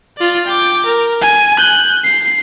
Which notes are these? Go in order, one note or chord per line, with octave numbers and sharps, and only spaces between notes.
F4 D5
G5 D6
A#4
G#5
F#6 G6
C7